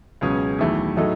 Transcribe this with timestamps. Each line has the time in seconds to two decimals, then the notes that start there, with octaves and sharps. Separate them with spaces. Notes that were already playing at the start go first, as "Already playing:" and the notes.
0.21 C#2 B2 F#3 C#4 G#4
0.59 E2 D#3 F#3 A3 E4
0.97 A2 F#3 A3 D#4 A4